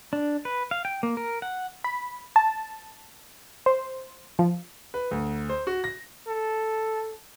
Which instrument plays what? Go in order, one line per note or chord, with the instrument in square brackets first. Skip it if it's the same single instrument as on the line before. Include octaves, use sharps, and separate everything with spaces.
[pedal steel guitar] D4
B4
F5
G5
A#3
A#4
F#5
[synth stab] B5
A5
C5
F3
[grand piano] B4
D2
C5
F#4
A#6
[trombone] A4